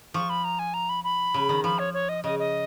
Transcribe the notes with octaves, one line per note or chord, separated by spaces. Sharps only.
F3 C#6
B5
A#5
G#5
A#5
B5
B5
C#3
D#3
F3 B5
C#5
C#5
D#5
C#3 D#5
D#5